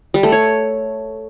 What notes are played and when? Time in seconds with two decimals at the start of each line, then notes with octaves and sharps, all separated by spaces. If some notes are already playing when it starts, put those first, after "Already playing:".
0.14 G3
0.23 A3
0.32 C#5